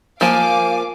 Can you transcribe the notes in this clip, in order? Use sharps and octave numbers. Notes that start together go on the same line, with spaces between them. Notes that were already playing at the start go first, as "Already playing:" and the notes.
F3 A#3 F5 G#5 D6